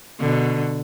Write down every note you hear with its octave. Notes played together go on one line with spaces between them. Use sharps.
B2 D3